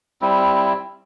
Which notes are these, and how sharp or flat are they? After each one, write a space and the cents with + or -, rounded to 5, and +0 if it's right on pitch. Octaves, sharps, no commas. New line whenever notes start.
G3 +0 C4 +0 E4 +0